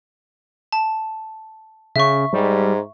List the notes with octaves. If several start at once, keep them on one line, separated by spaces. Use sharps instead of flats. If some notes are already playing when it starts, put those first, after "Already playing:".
A5
C#3 E5 C#6
G#2 G3